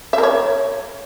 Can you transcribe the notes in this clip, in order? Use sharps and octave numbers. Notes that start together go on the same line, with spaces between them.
E5
A#4
C#5